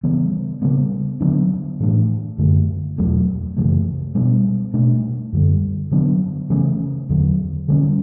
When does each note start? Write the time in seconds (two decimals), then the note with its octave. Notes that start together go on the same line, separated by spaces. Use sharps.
0.03 C#3 E3 G3 B3
0.62 C#3 G3 B3
1.21 D3 F#3 B3 D4
1.80 A2 E3 A3 D4
2.38 F#2 D3 A3
2.98 E2 B2 F#3 A3
3.57 F#2 C#3 E3 A3
4.15 B2 G3 B3 D4
4.73 B2 A3 D4
5.33 F#2 D3 G3
5.91 D3 F#3 B3 D4
6.50 C#3 E3 A3 C#4
7.09 E2 D3 F#3
7.68 D3 G3 C#4